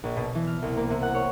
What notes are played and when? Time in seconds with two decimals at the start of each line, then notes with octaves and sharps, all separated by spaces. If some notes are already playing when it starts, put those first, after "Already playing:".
0.04 A#1
0.16 B2
0.35 E3
0.47 F6
0.62 C2
0.77 A#3
0.90 C3
1.02 F#5
1.15 C#5